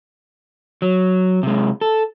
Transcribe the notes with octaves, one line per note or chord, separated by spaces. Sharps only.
F#3
C3 G#3
A4